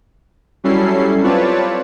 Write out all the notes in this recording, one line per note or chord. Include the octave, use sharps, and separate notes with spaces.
F#3 G3 C#4 E4 A4 C7
C4 F4 B4 C#5 D5 A5